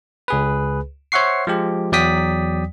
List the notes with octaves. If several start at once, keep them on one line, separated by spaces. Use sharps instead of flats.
C#2 G#4 B4
C5 C#5 E5 F#5 C#6 C7
F3 G#3 G4
E2 F#3 D5 G5 D#6 B6